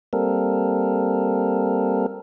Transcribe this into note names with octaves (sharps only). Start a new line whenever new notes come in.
G3 A#3 C4 A4 A#4